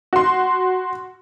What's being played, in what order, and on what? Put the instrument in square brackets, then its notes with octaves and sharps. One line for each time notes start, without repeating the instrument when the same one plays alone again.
[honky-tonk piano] F#4 C6